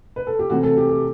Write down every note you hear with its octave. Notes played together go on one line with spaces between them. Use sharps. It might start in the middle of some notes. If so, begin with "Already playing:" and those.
B4
A4
G4
C3 E3 A3 F#4
A4
G4
G4